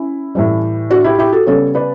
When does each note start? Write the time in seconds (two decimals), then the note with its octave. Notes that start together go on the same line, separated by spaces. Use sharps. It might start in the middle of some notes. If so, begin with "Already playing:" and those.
Already playing: C#4 E4
0.35 A2 E3 G3
0.90 D4 F#4
1.04 E4 G4
1.18 E4 G4
1.32 F#4 A4
1.46 C#3 G3 B3 A4 C#5
1.75 B4 D5